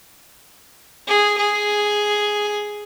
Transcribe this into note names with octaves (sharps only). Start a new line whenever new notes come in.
G#4
G#4